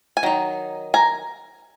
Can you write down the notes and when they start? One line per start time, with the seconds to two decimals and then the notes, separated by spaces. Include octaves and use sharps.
0.17 G#5
0.23 D#3 F#3 D#4
0.94 G#5 A#5